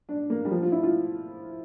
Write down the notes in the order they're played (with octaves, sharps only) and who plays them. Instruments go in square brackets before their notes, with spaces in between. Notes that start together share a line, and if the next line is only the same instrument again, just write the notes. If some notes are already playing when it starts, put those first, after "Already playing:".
[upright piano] D4
A#3
G3
F3
F4
E4
F4